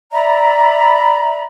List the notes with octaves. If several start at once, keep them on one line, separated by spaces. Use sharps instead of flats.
D5 E5 A#5 B5